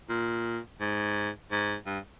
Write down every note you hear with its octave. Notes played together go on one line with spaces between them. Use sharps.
A#2
G#2
G#2
G2